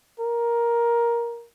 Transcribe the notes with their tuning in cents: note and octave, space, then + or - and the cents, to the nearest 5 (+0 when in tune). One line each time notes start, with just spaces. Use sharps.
A#4 +10